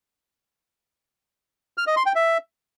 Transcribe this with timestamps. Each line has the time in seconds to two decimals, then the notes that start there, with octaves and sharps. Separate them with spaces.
1.78 F6
1.87 D#5
1.96 C6
2.06 G5
2.15 E5